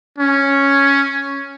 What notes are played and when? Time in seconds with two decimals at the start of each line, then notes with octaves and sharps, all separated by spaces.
0.18 C#4